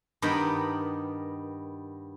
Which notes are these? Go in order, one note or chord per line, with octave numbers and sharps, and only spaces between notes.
G2 D#3 B3 A#4 G5 B5